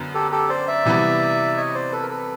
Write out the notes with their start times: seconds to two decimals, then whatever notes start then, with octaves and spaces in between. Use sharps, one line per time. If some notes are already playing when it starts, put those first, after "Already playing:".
Already playing: F#2 D3 B3
0.14 G4 A4
0.32 G4 A4
0.49 C5 D5
0.68 D5 E5
0.85 C3 E3 G3 B3
1.57 C#5 D#5
1.75 C5 D5
1.92 A4 B4
2.02 A#4
2.10 A4 B4